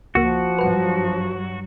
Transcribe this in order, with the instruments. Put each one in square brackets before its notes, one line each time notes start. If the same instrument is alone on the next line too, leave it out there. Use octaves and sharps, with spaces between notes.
[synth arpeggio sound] C#2 A#3 [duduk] F3 [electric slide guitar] F#4
[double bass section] G2 F#3 [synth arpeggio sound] B4 F#5